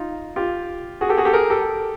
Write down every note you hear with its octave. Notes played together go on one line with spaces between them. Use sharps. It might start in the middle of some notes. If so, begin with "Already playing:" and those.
Already playing: D#4 F4
F4 G4
F#4 G#4
G4 A4
F#4 G#4
G4 A4
G#4 A#4
G4 A4